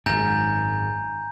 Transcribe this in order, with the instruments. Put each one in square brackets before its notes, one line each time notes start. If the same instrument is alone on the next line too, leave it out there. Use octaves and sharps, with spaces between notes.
[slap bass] G#1 F#2 [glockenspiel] G#5 A#5 G6